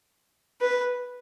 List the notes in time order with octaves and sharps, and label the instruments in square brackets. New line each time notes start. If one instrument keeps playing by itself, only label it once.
[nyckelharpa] B4